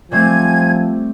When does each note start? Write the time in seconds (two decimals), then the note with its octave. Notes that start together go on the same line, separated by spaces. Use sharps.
0.12 F3 G3 A3 C4 G#5 G#6